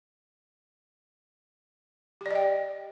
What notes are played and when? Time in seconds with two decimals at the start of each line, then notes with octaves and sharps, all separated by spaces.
2.21 G4
2.26 D5
2.31 D#5
2.35 G5